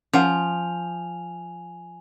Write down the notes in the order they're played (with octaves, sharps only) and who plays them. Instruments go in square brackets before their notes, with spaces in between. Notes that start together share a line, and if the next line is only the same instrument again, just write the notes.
[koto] F3 [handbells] C#4 F5 F#5 [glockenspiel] G#5 F7